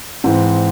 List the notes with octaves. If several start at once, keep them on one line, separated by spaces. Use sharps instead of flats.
G#2 E3 C4